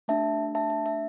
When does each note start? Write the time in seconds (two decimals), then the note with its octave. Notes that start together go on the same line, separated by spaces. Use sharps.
0.08 A3 D4 G4 E5 A5
0.55 E5 A5
0.70 E5
0.86 E5